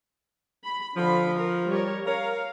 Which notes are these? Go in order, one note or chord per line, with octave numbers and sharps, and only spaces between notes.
B5
D3 F3 B5
A#4
G3 A#4 C#5
A#4 C#5 F5